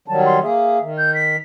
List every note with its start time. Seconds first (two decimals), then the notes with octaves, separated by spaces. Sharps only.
0.08 D#3 F#3 G3 A5
0.26 C6
0.43 A#3 G#4 E5
0.81 D#3
0.97 G6
1.14 B6